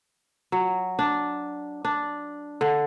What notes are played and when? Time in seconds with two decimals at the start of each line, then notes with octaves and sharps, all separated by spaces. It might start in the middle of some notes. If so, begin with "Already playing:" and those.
0.52 F#3
0.99 D4
1.85 D4
2.61 D3